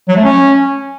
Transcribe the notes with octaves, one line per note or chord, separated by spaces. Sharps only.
F#3
A3
C#4